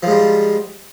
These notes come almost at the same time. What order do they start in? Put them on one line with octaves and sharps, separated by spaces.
F3 G#2 G3